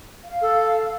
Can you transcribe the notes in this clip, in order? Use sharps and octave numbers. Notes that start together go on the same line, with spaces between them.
F5
A4